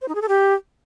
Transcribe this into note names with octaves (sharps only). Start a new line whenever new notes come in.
C5
D#4
G#4
A4
G4